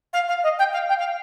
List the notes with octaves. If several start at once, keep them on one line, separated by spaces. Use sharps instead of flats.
F5
F5
D#5
G5
F5
G5
F5